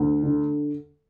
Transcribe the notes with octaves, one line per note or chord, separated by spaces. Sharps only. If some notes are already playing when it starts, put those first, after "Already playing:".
Already playing: D2
D3